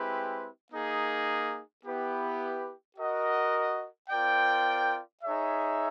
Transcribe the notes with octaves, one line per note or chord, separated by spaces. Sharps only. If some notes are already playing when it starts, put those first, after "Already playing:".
Already playing: G#3 C4 E4 G4 B4
A#3 D#4 G#4
B3 E4 G4 B4
F#4 A#4 D#5 F#5
C4 F4 A#4 D5 G5
D#4 G#4 C#5 E5